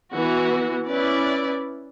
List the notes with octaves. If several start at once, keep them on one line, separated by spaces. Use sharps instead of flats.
E3 B3 F#4
C#4 E4 B4 D5